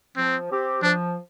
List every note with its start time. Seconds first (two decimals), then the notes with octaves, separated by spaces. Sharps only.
0.17 F3 C4
0.50 C4 G4
0.82 F3 D4